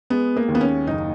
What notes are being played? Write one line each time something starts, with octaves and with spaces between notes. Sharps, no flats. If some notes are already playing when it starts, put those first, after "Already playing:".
G#3 B3
A#3
D#2
B3
C#4
F#1 D#4